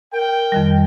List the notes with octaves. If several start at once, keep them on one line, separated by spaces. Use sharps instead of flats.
A#4 G5
F2 D#3 G3